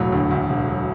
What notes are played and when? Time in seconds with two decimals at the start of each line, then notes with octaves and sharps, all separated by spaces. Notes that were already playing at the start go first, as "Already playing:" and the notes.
Already playing: E1 A2 F#3
0.12 D2
0.31 D2
0.49 E1
0.67 F#3